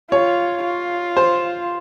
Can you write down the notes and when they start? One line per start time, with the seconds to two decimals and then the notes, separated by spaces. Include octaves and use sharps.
0.12 F4 C#5
0.64 F4
1.17 C5